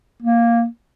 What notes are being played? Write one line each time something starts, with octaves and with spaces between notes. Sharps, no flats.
A#3